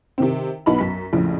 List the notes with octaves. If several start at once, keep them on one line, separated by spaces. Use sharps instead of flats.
C3 D#3 C4
B1 B3 D#4 A5 B5
F#2 B6
A#1 F2 A2 C#3